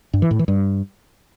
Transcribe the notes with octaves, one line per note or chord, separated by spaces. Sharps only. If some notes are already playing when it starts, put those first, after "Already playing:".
G2
E3
A2
E3
G2